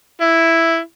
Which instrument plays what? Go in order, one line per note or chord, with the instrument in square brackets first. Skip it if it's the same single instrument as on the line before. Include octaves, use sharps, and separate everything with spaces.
[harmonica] E4